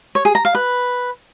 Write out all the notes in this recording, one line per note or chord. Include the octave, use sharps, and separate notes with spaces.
C#5
G#4
A#5
F5
B4